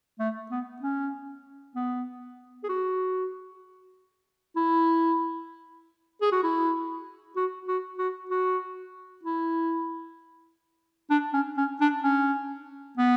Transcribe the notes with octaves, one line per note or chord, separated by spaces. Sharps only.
A3
B3
C#4
B3
G#4
F#4
E4
G#4
F#4
E4
F#4
F#4
F#4
F#4
E4
D4
C#4
C#4
D4
C#4
B3